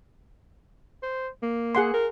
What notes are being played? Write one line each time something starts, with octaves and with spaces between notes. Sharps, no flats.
C5
A#3
G#4 F#5 C6
A#4